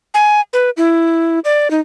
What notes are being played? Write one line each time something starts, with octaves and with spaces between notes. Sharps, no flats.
G#5
B4
E4
D5
D#4